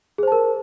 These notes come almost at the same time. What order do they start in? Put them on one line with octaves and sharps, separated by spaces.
G#4 C5 A5 A#4